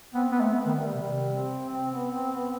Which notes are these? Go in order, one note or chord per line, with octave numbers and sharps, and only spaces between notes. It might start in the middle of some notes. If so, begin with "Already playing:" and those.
B3 C4
B3 C4
A3
B3
D#3
G3
C3 G3
C4
C4
B3
C4
B3